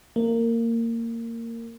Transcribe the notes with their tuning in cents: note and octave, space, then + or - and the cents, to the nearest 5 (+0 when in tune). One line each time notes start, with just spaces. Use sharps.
A#3 -20